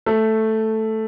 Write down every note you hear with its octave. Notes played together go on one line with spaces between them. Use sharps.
A3